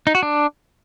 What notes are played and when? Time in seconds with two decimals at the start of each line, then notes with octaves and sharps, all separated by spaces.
0.07 D#4
0.15 F#4
0.23 D4